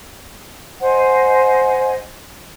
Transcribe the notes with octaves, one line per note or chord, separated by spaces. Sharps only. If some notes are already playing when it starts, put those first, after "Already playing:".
C5 D#5 F#5 G#5